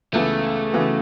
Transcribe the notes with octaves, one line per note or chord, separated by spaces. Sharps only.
C#2 C#3 E3 A3 B3
C#3 E3 B3 F#4